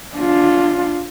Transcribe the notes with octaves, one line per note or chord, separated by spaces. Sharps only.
D4 F4